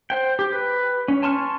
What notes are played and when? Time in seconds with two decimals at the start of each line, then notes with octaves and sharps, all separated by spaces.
0.10 C5 G5
0.39 G4
0.52 B4
1.08 C#4
1.23 G#5 A5 C6 C#6 F6